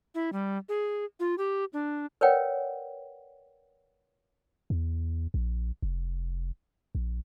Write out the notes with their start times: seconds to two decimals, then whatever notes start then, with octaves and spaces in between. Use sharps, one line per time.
0.15 E4
0.33 G3
0.69 G#4
1.20 F4
1.38 G4
1.73 D4
2.21 A#4 B4 C#5 D5 F#5 G5
4.70 E2
5.34 A#1
5.82 F1
6.95 A#1